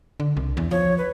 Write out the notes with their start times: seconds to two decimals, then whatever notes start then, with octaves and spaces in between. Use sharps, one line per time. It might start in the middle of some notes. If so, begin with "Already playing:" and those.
0.20 D3
0.37 C2
0.57 E2
0.71 F3 C#5
0.98 B4